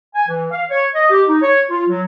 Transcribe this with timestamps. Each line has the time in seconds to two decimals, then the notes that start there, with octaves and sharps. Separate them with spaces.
0.15 G#5
0.28 E3
0.51 F5
0.70 C#5
0.94 D#5
1.10 G4
1.29 D#4
1.42 C#5
1.70 F4
1.89 F#3